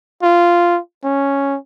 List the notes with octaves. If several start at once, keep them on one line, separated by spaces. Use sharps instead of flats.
F4
C#4